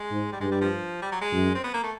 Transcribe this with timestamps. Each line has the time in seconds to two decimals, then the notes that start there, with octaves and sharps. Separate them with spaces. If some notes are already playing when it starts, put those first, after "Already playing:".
Already playing: G#3
0.11 G#2
0.32 G3
0.41 G2 G#3
0.51 G3
0.61 F3
1.02 G3
1.12 F#3
1.21 G#3
1.32 F#2
1.55 C4
1.64 B3
1.74 A#3
1.83 A3